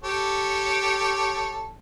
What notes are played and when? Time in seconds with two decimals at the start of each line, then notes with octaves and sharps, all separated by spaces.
0.03 G4 A4 C#5